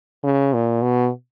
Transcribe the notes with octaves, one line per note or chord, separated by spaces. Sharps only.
C#3
A#2
B2